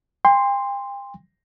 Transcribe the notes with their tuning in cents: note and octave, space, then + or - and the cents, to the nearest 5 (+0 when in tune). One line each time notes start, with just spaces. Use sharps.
G5 +40 C6 +0